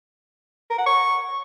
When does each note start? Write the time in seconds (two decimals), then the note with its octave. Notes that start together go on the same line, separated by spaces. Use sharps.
0.70 A#4
0.78 F#5
0.86 C#6